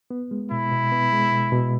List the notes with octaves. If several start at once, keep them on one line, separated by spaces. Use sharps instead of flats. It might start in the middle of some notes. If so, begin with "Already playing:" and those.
B3
G#3
B2 E4
B2
B3
G#3
B2
B2